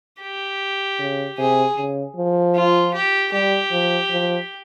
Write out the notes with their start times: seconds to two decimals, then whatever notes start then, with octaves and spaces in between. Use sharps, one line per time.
0.22 G4
0.99 C#3
1.38 C3 G#4
1.77 C#3
2.16 F3
2.55 F4
2.94 G4
3.33 G3 G4
3.71 F3
4.10 F3